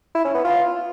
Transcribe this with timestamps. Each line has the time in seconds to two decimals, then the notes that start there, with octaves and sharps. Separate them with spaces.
0.15 E4
0.25 C#4
0.34 B3
0.44 F4